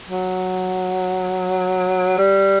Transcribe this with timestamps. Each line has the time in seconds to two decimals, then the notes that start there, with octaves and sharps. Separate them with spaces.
0.09 F#3
2.18 G3